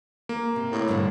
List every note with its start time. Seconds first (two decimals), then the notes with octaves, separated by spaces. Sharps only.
0.29 A#3
0.56 C3
0.72 A2
0.88 G2 A#2 D3